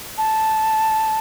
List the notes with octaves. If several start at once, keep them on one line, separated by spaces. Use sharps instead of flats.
A5